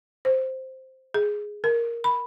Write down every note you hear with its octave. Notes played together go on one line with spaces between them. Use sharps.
C5
G#4
A#4
B5